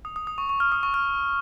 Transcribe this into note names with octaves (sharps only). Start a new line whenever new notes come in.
D#6
D#6
D#6
C#6
C#6
F6
D#6
C#6
F6